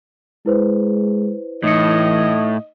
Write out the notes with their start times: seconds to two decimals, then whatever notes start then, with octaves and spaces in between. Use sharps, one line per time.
0.46 G#3 E4 B4 C5
1.63 A2 E3 D#4 D#5 C#7